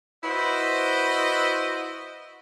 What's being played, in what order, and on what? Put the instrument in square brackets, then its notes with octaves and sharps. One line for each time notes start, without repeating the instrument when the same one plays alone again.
[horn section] E4 F#4 B4 C5 D#5